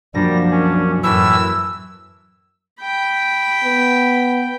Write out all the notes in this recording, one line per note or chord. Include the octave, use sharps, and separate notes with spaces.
F#2 F3 G3 A#3 D4 A#6
C#4 G#5
F#2 A2 E3 E4 E6
G5 B5
B3